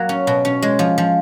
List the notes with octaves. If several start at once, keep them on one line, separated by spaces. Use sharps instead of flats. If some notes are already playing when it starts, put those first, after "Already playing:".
Already playing: F#3 A#3
C#4
B2
C#4
G#3
F3
F3